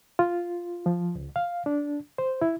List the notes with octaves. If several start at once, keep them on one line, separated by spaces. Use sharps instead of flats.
F4
F3
C#2
F5
D4
C5
E4